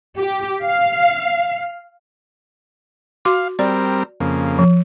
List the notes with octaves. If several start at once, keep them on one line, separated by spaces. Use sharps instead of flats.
G4
F5
F#4 F5 C6 D6
G3 C4 A#4 D5
F2 C#3 A#3
F3